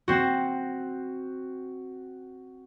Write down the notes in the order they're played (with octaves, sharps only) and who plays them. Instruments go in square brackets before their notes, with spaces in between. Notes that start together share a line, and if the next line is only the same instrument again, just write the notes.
[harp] C4 F#4